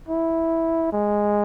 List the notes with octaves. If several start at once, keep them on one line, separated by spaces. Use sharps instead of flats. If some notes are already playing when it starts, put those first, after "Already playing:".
E4
G#3